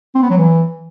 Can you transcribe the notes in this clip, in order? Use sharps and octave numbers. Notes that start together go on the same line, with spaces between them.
C4
B3
F#3
E3